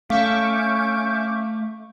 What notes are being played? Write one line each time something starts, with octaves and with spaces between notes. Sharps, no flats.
A3 C#4 E5 F5 C#6 D6 F6 G6